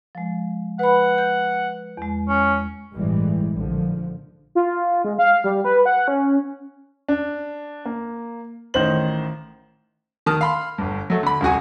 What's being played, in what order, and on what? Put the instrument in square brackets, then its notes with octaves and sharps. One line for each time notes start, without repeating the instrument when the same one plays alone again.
[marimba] F3 G#3
[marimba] B4 B5 [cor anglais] F#5
[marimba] G6
E2 G#3
[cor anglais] C#4
[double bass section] G1 A2 E3 G3 G#3
A#1 D3 F3
[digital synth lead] F4
G#3
F5
G3
B4
F#5
C#4
[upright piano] D4
A#3
A1 D#3 D#4 C5 F#7
[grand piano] D#3 A5 D#6 F6
F5 B5 C6
G1 G2
F#3 A3
D3 B5
D#1 C2 F#4 G#5